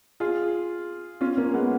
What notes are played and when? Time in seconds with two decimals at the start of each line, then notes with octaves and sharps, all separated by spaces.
0.20 F4 G#4
1.21 C#4 F4
1.37 A#3 C#4
1.54 G#3 B3